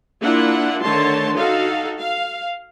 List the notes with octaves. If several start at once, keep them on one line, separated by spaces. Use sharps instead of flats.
A#3 D4 E4 F4 F#5
D3 D#3 A3 C#5 A5 C6
D#4 F#4 A4 F5
F5